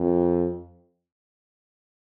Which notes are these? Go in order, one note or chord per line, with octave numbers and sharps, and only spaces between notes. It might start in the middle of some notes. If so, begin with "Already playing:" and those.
Already playing: F2